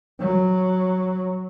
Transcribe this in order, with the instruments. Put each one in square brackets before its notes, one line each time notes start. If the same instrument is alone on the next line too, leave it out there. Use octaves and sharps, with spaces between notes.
[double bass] F#3